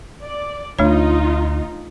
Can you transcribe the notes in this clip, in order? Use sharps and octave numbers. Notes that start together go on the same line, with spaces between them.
D5
D2 A3 D4 D#4 F4 C#5